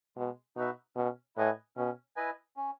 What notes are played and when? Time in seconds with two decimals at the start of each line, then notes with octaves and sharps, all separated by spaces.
0.16 B2 G#3
0.56 B2 D#4 F#4 B4 E5
0.96 B2 C#4
1.36 A2 E4 B4 D#5 G#5
1.77 B2 C#4
2.16 E4 B4 D#5 G#5
2.57 C#4